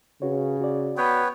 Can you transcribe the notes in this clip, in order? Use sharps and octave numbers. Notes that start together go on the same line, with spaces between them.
C#3 F#4 B4 C#5
F#4 D5
B3 B4 C#5 G5